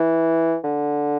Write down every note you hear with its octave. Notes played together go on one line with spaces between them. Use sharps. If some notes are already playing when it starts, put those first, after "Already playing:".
Already playing: E3
D3